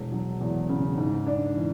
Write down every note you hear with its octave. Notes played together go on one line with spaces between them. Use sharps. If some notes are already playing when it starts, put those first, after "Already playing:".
Already playing: E1
F#3
E2
C#3
G#2
D4
E3